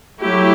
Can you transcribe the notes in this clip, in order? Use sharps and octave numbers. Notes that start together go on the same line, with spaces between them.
F#3 A3 E4 G4